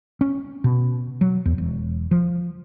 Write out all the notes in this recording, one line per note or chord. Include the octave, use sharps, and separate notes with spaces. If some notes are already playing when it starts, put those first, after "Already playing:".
C#4
B2
F#3
E2
E1
F3